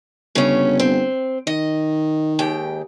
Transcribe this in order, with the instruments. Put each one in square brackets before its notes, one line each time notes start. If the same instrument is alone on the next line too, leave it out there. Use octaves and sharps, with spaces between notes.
[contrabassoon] G1 [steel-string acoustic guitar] C#3 C#4
[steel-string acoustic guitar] C4
[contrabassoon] D#3 [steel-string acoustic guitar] D#5
[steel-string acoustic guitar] D#2 G#2 G5